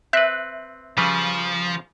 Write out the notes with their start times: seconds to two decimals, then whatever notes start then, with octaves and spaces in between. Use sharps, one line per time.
0.13 C4 B4 E5 F#6
0.98 C#3 F3 G3 B4